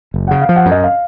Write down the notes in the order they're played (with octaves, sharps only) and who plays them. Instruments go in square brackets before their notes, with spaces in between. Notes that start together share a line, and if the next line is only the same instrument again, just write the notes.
[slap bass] F#1
[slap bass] C#3 [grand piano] F#5
[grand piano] F5
[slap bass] F3
[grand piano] F#5
[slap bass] F#2
[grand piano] D#5
F5